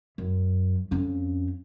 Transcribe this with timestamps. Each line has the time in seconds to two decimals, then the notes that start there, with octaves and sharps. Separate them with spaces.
0.18 F#2
0.91 F2 C#4